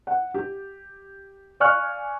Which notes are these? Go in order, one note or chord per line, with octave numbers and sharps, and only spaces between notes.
F#5
G4
D5 F5 G#5 C#6 F6 F#6